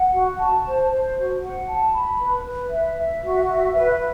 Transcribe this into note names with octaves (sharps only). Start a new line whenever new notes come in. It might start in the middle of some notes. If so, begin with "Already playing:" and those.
Already playing: F#5
F#4
A5
C5
C5
F#4
F#5
A5
B5
B4
B4
E5
E5
F#4
E5
B4